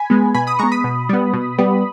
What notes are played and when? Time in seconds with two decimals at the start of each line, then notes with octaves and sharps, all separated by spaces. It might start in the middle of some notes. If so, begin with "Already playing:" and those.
Already playing: G#5 B5
0.10 G#3 B3
0.34 B2 G#5 B5
0.47 B5 D#6
0.59 G#3 B3 A#5 C#6
0.72 B5 D#6
0.84 B2
1.09 G3 B3
1.34 B2
1.58 G3 B3